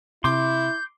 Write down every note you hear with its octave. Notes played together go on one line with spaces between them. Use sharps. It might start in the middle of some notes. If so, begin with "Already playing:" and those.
C3 E4 C6 D6 G6